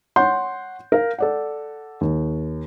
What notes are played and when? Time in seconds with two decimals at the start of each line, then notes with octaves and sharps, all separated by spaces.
0.16 C#5 F#5 C6 G6
0.92 A#4 F5
1.18 A4 D5 F#5
2.01 D#2